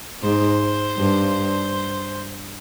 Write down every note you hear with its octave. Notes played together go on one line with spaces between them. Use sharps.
G#2 C5
G2